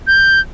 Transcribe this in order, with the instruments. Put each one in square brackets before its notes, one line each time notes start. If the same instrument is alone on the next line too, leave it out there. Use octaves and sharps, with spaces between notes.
[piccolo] G6